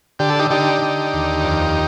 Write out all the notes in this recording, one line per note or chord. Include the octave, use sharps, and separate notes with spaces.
D3 G4
A4
D#4 G4
D3 D#4 G4
D3
D#2
F2